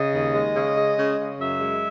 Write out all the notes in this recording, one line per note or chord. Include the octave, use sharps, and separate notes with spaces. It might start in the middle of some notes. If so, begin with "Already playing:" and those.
Already playing: C#3 D#5
D#2
G#3
C#3
G#3
C#3
C#3
F#2 E5
G#3